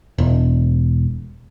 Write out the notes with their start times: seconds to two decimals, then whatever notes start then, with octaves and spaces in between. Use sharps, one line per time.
0.18 E1